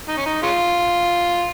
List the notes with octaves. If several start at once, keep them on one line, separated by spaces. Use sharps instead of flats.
D#4
C#4
D#4
G#3 C#4 F4